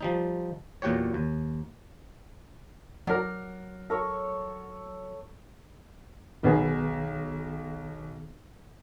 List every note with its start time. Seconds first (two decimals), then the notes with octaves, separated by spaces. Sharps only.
0.01 F3 G3 D#4
0.82 E2 A#2 F#3 F#4 G4 C#5
1.14 D#2
3.07 F#3 A#4 D5 F#5
3.90 A4 A#4 C#5 C#6
6.43 B1 B2 D#3 B3 G#4